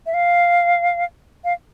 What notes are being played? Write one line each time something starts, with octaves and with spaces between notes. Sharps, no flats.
E5
F5
F5